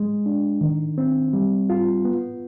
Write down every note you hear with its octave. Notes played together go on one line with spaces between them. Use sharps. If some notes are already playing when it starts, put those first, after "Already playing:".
Already playing: G#3
D4
D#3
C4
G3
F4
B3